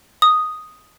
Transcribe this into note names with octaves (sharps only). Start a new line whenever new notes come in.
D#6